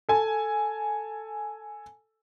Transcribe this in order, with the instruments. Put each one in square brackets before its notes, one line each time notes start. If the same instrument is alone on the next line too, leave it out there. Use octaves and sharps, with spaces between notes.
[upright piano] A4 G#5